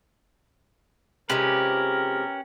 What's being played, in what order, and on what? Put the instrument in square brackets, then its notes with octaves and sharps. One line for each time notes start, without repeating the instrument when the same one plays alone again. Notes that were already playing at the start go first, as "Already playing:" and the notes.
[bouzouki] C3 F3 G#3 [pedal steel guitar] C#4 G4 B4 [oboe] A#4